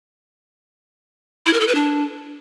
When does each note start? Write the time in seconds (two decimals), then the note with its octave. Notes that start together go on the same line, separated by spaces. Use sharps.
1.46 E4
1.53 A#4
1.60 A4
1.68 B4
1.75 D4